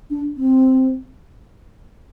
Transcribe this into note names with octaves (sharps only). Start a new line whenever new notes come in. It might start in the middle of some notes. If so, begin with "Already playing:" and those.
D4
C4